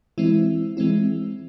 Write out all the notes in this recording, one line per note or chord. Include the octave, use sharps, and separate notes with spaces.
E3 G#3 C4 E4
E3 G#3 C4 E4